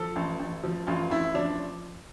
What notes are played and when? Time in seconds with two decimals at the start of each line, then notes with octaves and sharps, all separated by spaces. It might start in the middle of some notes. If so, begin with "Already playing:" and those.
Already playing: F3 A4
0.16 A1
0.40 A1
0.63 F3
0.87 A1 F4
1.11 A1 E4
1.34 F3 D4